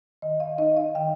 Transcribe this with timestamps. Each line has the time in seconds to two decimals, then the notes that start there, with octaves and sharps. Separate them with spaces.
0.22 D#3 D#5
0.40 F5
0.58 D#4 D#5
0.77 F5
0.95 D#3 G5